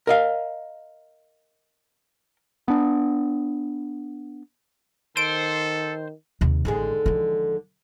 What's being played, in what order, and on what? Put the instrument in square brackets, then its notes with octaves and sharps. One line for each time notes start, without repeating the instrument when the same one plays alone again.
[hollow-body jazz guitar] A#4 D#5 F5
[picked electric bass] B3 D4
[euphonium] D#3 [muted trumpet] A4 [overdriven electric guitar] C5 [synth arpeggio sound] D7
[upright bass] D#2 C3
[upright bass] A1 [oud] D#2 D3 G#3
[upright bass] E3 F3